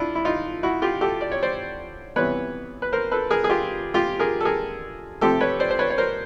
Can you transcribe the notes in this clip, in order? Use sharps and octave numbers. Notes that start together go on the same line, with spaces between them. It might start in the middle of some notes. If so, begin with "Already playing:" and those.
Already playing: D4 E4 F4
E4
D#4 F4
E4 F#4
F4 G4
G4 A4
D5
C#5
C5 D5
C3 E3 G3 B3 B4 C#5
B4
A#4 C5
A4 B4
G#4 A#4
G#4
F4 G4
F4 G4
G#4 A#4
A4
G#4 A#4
C3 F3 A3 C4 G4 A4
B4 C#5
C5 D5
C5
B4 C#5
C#5
A#4 C5